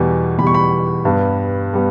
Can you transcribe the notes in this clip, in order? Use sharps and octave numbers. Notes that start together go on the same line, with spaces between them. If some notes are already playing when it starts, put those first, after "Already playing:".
Already playing: E2 B2 G3 G#5
E2 B2 G3 B5
C#6
B5
G2 G3 B3
G3 B3